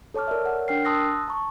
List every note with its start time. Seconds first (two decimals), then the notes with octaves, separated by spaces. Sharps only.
0.14 A4 C#5 A5 D6 F6
0.28 A#4 D5 E5
0.45 C#5 F#5
0.68 D4 A#4 G5 F6 C7
0.85 A5 C6 D#6 E6 F#6 A#6
1.28 A5 A#5 C#6